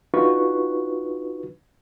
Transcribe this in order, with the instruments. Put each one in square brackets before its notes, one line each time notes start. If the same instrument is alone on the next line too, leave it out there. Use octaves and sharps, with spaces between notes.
[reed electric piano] D4 D#4 F4 F#4 B4 C#6